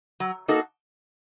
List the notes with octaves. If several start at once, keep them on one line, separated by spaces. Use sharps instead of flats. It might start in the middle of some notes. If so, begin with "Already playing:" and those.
F#3
A#3 D#4 F#4 A4